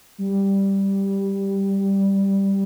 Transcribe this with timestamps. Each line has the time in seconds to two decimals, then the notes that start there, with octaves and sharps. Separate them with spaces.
0.18 G3